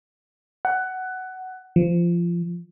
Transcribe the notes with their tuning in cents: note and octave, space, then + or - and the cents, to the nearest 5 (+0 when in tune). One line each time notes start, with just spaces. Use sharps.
F#5 +15
F3 -20